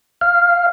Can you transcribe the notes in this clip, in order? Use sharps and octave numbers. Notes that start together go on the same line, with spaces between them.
F5